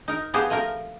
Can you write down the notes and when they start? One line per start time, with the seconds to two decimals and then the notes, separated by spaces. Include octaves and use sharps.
0.08 D#4 A#4
0.34 F3 B3 C4 G4 G#4 C5
0.50 F3 A3 C4 A#4